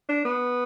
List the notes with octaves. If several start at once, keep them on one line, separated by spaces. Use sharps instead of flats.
D4
B3